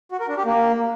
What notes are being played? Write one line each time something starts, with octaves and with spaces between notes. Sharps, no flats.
F#4
A#4
D4
G4
A#3